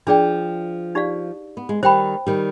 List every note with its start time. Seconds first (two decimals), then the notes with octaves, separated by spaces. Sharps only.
0.07 F3 D4 G#4 D5 G5
0.95 D#4 G4 D5 F5
1.57 B3
1.69 G#3
1.83 D#3 G3 C5 G5 B5
2.27 D#3 G3